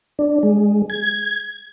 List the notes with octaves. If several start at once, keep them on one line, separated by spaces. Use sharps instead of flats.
D4
G#3
G#6